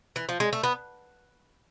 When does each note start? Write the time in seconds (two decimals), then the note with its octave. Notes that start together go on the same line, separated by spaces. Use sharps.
0.16 E3
0.29 F3
0.40 G#3
0.53 A3
0.63 B3